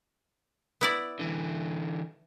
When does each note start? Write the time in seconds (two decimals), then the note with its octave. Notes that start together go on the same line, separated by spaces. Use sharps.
0.81 B3 E4 D5
1.19 D3 E3